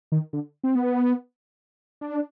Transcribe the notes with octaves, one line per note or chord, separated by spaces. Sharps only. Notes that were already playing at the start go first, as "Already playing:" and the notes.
D#3
D3
C4
B3
D4